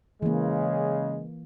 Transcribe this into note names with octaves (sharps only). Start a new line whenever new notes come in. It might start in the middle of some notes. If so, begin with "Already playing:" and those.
C#3 E3 G#3 A#3